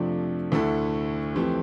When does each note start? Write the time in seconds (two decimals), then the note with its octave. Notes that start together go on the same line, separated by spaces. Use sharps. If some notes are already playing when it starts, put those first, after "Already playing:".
Already playing: F2 C3 F3 A3 D4
0.52 D2 D3 A3 E4 A4
1.35 F2 E3 A3 C4 G4